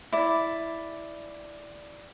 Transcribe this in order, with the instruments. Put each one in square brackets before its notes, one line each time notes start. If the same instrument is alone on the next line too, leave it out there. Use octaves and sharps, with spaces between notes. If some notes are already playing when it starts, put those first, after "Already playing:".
[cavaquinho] E4 D5